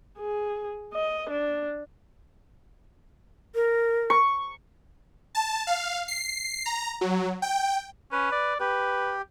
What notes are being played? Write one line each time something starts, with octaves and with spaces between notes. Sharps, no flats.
G#4
D#5
D4
A#4
C#6
A5
F5
C7
A#5
F#3
G5
C#4 B4
D5
G4 B4